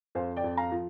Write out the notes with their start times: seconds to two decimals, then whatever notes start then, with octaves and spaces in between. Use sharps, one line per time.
0.15 F2 C5 F5
0.37 D5 G5
0.44 F2
0.57 F5 A#5
0.72 F3